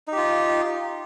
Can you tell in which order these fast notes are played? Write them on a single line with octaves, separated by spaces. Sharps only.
D#4 G4 F4